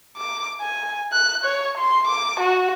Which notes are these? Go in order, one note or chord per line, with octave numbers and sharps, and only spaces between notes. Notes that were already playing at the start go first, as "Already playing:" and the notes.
D6
G#5
F#6
C#5
C6
D6
F#4